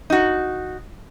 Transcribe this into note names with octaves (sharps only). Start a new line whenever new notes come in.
D#4 F#4